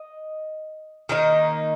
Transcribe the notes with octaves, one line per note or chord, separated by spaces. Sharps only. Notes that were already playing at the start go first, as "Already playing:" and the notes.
Already playing: D#5
D#3 A#3 D#4